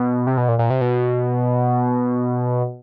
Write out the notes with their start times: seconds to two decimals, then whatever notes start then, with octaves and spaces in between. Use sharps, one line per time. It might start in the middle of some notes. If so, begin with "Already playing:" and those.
Already playing: B2
0.27 C3
0.37 B2
0.48 A#2
0.59 A#2
0.70 C3
0.81 B2